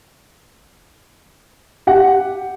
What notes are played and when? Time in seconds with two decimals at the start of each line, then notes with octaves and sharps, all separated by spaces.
1.87 G4 F#5